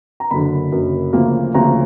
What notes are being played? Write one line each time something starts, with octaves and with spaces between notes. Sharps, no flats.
A#5
F#1 F#2 D3 B5
F#1 F#2 D3
D2 C#3 F3 A#3
D2 C#3 F3 A#3 A#5